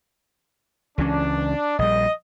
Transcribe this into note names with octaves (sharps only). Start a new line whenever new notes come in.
C#2 E3 C#4 D4
A#1 G3 D#5